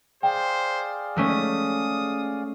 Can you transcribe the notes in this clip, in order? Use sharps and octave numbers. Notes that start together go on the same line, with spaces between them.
G#4 C5 D5 F5 G5
G#3 A3 C#4 D#6